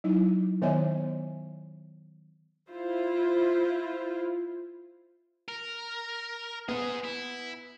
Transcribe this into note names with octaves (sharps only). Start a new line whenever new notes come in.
F#3 D#4 E4
D#3 B3 C#5 D#5 E5 G#5
E4 F4 C5
A#4
B3 G#4 C5
E4